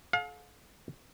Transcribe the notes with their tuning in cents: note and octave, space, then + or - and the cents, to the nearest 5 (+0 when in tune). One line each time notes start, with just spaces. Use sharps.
A4 -40 F5 +35